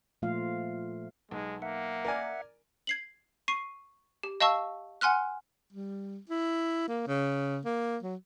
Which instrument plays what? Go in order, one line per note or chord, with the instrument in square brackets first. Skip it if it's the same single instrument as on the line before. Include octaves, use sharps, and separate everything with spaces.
[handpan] A#2 F3 A3 F4 F5
[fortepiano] B1 [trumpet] G#3
[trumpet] A#3 [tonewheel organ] E5 F#5
[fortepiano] A#4 D5 G#5
[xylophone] G#6 C7 F#7
C#6 C7 D#7
G4
D#5 F5 A5 C#6 E6
F#5 G#5 C6 F6 F#6
[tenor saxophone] G3
E4
A#3
C#3
A#3
F#3